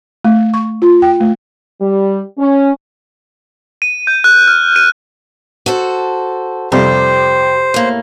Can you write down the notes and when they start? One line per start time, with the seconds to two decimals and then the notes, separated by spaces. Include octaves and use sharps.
0.24 A3
0.54 C#6
0.82 F4
1.02 G5
1.20 A3
1.81 G3
2.38 C#4
3.82 D#7
4.07 G6
4.24 F#6
4.48 F6
4.76 D#7
5.66 F#4 A4 C5
6.72 F2 C3 G3 G4 C5
7.74 A2 A#3